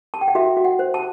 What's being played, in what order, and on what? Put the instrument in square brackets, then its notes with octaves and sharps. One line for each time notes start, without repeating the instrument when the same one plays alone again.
[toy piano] A5
G5
F#5
F#4 E5
F#4
F#5
C5
A5